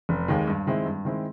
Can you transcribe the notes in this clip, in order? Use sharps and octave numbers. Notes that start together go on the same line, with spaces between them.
F1
D#2 D#3 G#3
G2
D#3 G#3 C4 E4
G2
D#3 G#3 C4 E4